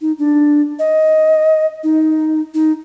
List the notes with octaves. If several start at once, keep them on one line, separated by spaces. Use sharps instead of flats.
D#4
D4
D#5
D#4
D#4